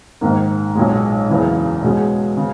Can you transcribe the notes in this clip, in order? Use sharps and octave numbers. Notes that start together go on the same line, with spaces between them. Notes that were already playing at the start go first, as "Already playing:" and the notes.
A#1 G#2 D#3 A#3
B1 A#2 G#3
F#1 E2 C#3 E3
B2 G#3 C#4 G#4
C#3